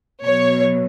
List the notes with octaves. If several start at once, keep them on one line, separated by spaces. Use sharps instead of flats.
B2 F#3 C#5